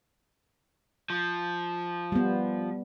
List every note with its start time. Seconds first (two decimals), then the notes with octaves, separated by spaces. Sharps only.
1.10 F3
2.12 G3 B3